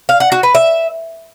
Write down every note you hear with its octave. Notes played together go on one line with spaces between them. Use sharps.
F5
F#5
F#4
B4
E5